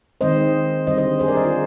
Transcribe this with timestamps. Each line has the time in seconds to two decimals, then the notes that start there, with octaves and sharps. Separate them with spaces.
0.21 D#3 G#3 C4 C5 D#5
0.87 D3 G3 C4 C5 D#5
0.98 C5 D#5
1.20 G#4 C5
1.28 A#4 D5
1.37 C5 D#5
1.44 F4 G#4